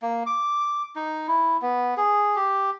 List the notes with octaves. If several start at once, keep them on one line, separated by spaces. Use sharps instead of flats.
A#3
D6
D#4
E4
B3
G#4
G4